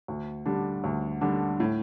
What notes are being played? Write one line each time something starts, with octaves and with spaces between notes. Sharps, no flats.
D2
D3 G3 D4
D2
D3 G3 D4
A2